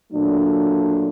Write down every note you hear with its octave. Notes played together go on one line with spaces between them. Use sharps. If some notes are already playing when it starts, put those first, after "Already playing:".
A#2 F#3 A3 D4